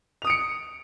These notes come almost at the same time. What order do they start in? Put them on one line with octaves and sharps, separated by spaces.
F7 D#6 D7 C#7